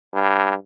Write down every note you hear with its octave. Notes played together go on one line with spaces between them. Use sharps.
G2